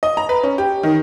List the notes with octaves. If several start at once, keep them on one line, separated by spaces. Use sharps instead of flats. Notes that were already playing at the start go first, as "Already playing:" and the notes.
D#5
A#5
B4
C#4
G4
D#3